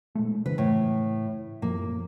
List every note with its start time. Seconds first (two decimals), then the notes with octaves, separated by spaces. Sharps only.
0.15 A#2 G#3 A3
0.46 C#3 E3 B4
0.58 A2
1.62 F#2 A#2 F3 A#3